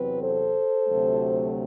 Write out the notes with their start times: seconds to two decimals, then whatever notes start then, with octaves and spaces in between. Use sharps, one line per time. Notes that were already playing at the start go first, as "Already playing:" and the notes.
Already playing: E2 C3 F#3 C4 B4
0.22 A4 C5
0.87 D2 C3 F#3 A3